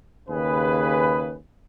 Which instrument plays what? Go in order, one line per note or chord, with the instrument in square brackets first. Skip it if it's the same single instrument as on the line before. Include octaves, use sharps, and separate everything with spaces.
[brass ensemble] D#2 C#3 G#4 B4